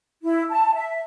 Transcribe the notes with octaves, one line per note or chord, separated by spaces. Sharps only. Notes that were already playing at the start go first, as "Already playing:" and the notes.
E4
A5
E5